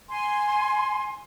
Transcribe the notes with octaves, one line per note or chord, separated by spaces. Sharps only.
G#5 C6